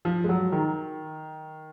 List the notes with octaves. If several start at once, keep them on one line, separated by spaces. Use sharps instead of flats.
F3
G#3
F#3
D#3